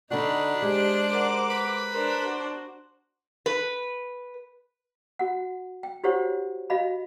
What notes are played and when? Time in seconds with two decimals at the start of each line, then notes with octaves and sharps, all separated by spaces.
0.11 D3 D4 D#4 F#4 B5
0.62 G#3 G4 C5 D6
1.11 A#4 F#5
1.50 B4
1.92 D4 A#4 C5
2.24 F#4
3.46 B4
5.19 F#4 F#5
5.83 G5
6.04 E4 F#4 G4 C5 C#5 F#5
6.70 F#4 D#5 F5 B5